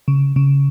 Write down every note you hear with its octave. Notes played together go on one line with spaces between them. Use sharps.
C#3
C#3